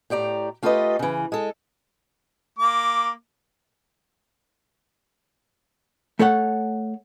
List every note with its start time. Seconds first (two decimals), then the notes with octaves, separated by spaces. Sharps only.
0.10 A2 G4 D5 A#5
0.63 A3 F4 G4 A4 B4 D#5
0.99 C#3 E3
1.32 G#3 A4
2.59 A#3 D6
6.19 A3 A4 C#5 F#5